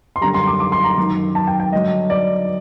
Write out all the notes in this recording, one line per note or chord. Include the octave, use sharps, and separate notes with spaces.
C6
F#2 D3 G3 A#5
C6
D6
D6
C6
A#5
F#2 D#3 F#3
A5
G5
G5
G2 D3 F#3 D#5
D5